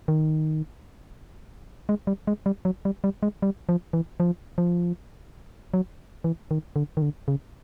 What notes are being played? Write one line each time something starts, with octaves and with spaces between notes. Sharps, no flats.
D#3
G#3
G3
G#3
G3
F#3
G3
G3
G#3
G3
F3
E3
F3
F3
F#3
E3
D#3
D3
D#3
D3
C#3